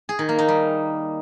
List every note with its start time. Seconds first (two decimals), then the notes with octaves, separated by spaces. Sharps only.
0.09 G#4
0.19 D#3
0.29 A#3
0.39 D#4
0.48 G3